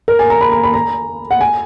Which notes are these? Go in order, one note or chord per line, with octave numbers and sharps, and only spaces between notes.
A#4
G#5
A#5
B5
A#5
B5
A#5
F#5
G#5